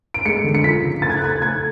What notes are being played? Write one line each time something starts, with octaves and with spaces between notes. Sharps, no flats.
D7
G#3 C#7
D3
C#7
F3 B6
C#3
A3 A6
G#6
F#6
A3 G#6
A3 G#6